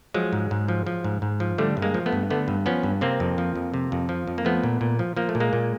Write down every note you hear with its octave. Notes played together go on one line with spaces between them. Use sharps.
F3 F#3 G#3
G#2
G#2
F3
F3
G#2
G#2
F3
D3 G3 A3
G2
G#3 A#3
F3
A3 B3
G2
D3 A3 B3
G2
F3 B3 C#4
G2
C3 A#3 C4
F2
F3
F2
C3
F2
F3
F2
A#3
F3 A3 B3
A#2
A#2
F3
F3 A#3
A3
A#2
G#3 A#3
A#2